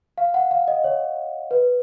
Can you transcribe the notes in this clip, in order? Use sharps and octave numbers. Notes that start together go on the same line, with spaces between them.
F5
F#5
F5
D#5
C#5
B4